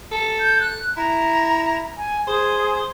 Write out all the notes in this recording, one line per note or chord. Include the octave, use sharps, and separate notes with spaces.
A4
G6
F#6
E4 A#5
G#5
G#4 C5